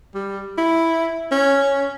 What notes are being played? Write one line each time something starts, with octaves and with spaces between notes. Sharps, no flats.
G3
E4
C#4